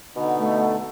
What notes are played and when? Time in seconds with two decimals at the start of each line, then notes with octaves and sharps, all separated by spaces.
0.16 B2 D3 B3 D#4
0.39 A3